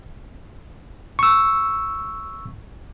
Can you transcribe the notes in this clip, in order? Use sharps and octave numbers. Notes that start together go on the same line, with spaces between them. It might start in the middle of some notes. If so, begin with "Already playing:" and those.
C#6 E6